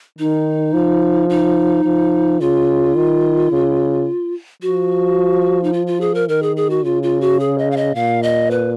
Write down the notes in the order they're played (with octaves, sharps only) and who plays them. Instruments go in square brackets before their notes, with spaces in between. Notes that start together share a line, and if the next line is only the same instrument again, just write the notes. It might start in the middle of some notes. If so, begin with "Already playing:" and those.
[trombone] D#3 [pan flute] D#4
[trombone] F3
[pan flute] D#4
[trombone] F3
[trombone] C#3 [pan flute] F4
[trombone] D#3
C#3
[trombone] F3 [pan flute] F#4
[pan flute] D#4
F4
F4
G#4
A#4
[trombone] D#3 [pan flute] A#4
[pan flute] G#4
G#4
F#4
[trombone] C#3 [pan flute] F4
[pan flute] F4
F#4
G#4
D#5
F5
D#5
[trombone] A#2 [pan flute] F5
[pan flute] D#5
B4